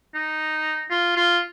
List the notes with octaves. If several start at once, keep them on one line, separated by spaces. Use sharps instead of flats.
D#4
F4
F4